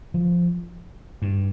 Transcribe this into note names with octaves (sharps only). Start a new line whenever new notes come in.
F3
G2